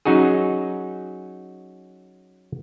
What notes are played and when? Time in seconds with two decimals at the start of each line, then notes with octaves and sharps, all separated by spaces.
0.05 F#3 C#4 D#4 F#4 G#4